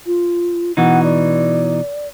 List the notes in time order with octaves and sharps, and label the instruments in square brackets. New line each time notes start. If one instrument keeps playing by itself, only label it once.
[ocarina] F4
[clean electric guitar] B2 E3 D#4 [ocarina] F#5
[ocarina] D5